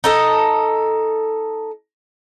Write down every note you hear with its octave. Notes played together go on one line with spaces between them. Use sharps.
D#4 A4 D#5